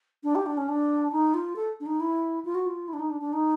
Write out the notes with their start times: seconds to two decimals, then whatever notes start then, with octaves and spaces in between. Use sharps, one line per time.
0.23 D4
0.35 G4
0.46 D4
0.57 C#4
0.68 D4
1.12 D#4
1.34 F4
1.56 A4
1.80 D4
1.86 D#4
2.00 E4
2.44 F4
2.54 F#4
2.66 F4
2.88 E4
2.93 D4
2.99 D#4
3.10 D4
3.21 D4
3.33 D#4